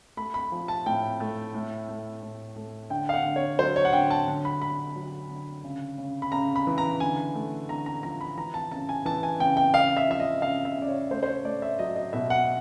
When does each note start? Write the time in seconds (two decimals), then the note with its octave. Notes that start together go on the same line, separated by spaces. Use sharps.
0.17 A3 B5
0.34 B5
0.52 F3
0.68 A5
0.86 A2 G5
1.20 A3
1.54 A2
1.89 A3
2.23 A2
2.56 A3
2.90 D3 G5
3.09 F5
3.14 F#5
3.25 D3
3.36 C#5
3.59 F#3 C5
3.76 C#5
3.85 F#5
3.93 D3 G5
4.10 A5
4.28 D3
4.45 B5
4.62 D3 B5
4.96 F#3
5.30 D3
5.64 C#3
5.98 C#3
6.22 B5
6.32 C#3 A#5
6.56 B5
6.67 E3
6.78 A#5
7.00 D3 G#5
7.35 A3
7.69 D3 A#5
7.86 A#5
8.03 F3 A#5
8.21 B5
8.37 E3 A#5
8.54 A5
8.71 C#3 A5
8.89 G#5
9.05 E3 A5
9.23 G#5
9.40 C#3 G5
9.57 G5
9.74 C#3 F5
9.97 E5
10.08 F3 E5
10.20 D#5
10.42 C#3 F5
10.65 E5
10.77 C#3
10.82 D5
10.88 C#5
11.11 A3 C5
11.23 C5
11.27 C#5
11.45 A3 D5
11.62 E5
11.79 F#3 D#5
11.96 D#5
12.13 B2 E5
12.30 F#5